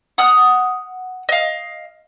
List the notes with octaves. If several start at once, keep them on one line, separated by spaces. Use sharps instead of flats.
F#5 D#6 F6
D#5 F5